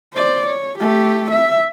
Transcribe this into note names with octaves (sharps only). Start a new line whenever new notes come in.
C5 D5
C#5
A3 G4
E5